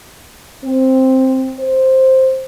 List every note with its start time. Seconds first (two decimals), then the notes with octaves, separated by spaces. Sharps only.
0.64 C4
1.60 C5